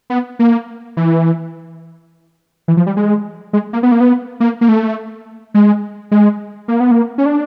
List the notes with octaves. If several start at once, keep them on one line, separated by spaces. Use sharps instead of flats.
B3
A#3
E3
E3
F3
G3
G#3
G#3
A#3
B3
A#3
B3
A#3
A#3
A3
G#3
G#3
A#3
B3
A#3
C#4
D4